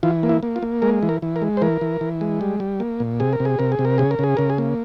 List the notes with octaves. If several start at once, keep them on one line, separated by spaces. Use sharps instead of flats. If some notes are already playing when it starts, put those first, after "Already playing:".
E3 F4
A#3
E4
A#3
F4
A#3
G#3 A#4
E3
A#4
E3
A#4
G#3
C5
E3 A#4
E3
E3
G#3
G3
G3
A#3
A#2
C3 G#4
A#4
C3
G#4
C3 A#4
G#4
C3
A#4
C#3 G#4
A#4
C#3 G#4
C#3 A#4
G#4
A#3